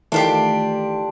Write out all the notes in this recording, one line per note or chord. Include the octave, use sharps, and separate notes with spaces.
D#3 E3 A3 D4 F4 G4